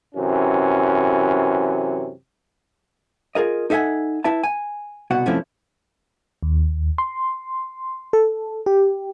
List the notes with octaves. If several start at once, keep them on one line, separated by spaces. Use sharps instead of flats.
F#2 C3 E3 C#4
F4 G#4 A#4 D#5
D#4 A4 E5 F#5 G#5
E4 B4 E5 A5
G#5
C2 B2 F#4 F#5
G2 C3 F3 A3 C#4 E4
D#2
C6
A4
G4